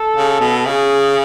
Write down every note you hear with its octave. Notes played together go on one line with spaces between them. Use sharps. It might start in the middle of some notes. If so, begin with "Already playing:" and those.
Already playing: A4
C#3
B2
C#3 G#4